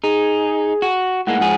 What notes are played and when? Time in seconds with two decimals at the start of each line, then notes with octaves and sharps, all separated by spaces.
0.04 D#4 G#4
0.82 F#4
1.27 A2 G#3 A#3 F#5
1.40 G#2 F3 G#4 F#5